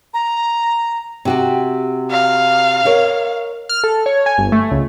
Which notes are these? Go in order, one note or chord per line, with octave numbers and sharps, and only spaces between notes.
A#5
C3 F#4 G4
F5
A#4 C#5 D#5
F6
A4
C#5
G#5
G1
A3
C#2